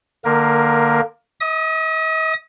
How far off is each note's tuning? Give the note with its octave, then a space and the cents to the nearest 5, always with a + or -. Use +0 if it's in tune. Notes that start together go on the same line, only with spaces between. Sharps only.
D3 +30 A#3 +0 A#4 +15
D#5 +45 D#6 -5